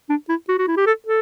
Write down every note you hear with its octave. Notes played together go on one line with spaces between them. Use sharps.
D4
E4
F#4
F#4
E4
G4
A4
A4